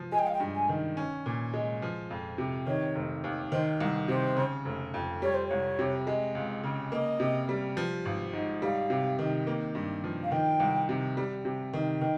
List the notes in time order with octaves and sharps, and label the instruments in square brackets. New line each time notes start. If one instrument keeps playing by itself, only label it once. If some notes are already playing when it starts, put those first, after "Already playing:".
Already playing: [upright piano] F3
[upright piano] G#3 [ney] G#5
[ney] G5
F5
G5
[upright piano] G2
[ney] G#5
[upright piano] D#3
C#4
A#2
G#3
F3
F2
C3
[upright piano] D#3 [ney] C#5
[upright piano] F1
D#2
[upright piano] D#3 [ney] C5
[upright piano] C2 [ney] A#4
[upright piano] C3 [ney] C5
[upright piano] C#3
F1
F2
[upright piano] G3 [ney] C#5
[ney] C5
[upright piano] C2 [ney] C#5
[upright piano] C3
G#3
C#2
C#3
[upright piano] A#3 [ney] D#5
[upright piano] C3
G3
F3
G#1
G#2
[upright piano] G3 [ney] F5
[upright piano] C3
D#3
A#3
G2
F3
[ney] F5
[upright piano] D#3 [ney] G5
[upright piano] C2
C3
G3
C3
D#3
[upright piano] D#3 [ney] G5